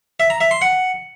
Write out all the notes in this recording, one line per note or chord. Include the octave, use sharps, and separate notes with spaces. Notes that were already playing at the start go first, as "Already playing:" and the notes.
E5
A#5
E5
C6
F#5